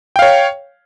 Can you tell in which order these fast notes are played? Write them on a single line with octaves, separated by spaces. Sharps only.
G5 F5 C#5